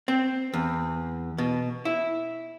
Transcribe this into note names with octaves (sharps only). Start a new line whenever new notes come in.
C4
E2
B2
E4